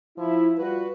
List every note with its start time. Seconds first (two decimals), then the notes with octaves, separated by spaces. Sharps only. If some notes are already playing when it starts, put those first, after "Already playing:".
0.18 F3 E4
0.58 G3 F4 F#4 B4